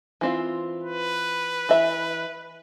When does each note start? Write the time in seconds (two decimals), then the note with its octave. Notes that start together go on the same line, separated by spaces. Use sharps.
0.21 E3 C4 F4
0.84 B4
1.69 E3 E5 B5